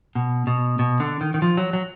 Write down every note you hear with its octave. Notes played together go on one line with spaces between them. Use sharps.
B2
B2
B2
D3
D#3
D#3
F3
F#3
F#3